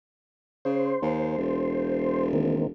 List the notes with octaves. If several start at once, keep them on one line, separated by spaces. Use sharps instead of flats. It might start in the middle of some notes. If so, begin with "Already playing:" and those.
C#3 C5
D#2
E1
D#3 A#3 C4